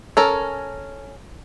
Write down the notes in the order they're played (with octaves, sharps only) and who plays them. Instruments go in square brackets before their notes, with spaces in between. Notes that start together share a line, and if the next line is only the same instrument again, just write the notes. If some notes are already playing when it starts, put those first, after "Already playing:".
[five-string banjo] C#4 A4 A#4